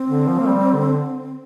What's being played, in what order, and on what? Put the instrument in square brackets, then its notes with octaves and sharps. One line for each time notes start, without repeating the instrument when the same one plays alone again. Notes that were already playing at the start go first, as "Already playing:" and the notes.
Already playing: [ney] C4
[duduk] D3
F3
A#3
G3
D3